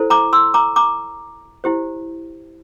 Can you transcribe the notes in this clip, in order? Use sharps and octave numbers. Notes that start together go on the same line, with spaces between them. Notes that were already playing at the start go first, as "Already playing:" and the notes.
Already playing: E4 A4 C5
A#5 D6
C6 E6
A#5 D6
A#5 D6
E4 G4 C5